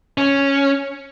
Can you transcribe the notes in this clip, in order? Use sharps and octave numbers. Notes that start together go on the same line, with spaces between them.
C#4